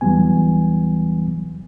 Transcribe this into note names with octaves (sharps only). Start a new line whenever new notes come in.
E2 E3 F#3 G3 B3 G#5